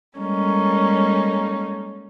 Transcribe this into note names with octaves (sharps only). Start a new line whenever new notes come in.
G3 G#3 A#3 C#4 D#4 A4